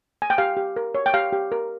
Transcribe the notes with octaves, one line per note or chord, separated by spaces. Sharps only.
G#5
G5
G4 F5
G4
A#4
C#5
G5
G4 F5
G4
A#4